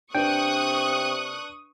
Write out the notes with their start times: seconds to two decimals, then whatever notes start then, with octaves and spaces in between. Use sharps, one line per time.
0.15 C3 D4 B4 G5 C#6 D#6 F#6